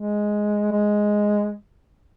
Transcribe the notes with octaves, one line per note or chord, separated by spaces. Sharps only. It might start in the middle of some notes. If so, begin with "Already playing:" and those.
Already playing: G#3
G#3